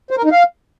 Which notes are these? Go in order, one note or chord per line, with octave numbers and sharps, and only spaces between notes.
C5
A#4
D#4
F5